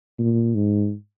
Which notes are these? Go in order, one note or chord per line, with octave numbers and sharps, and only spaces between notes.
A#2
G#2